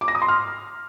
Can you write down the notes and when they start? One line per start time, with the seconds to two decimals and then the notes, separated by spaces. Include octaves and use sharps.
0.01 D6
0.08 A#6
0.15 D#6
0.22 C6
0.28 F6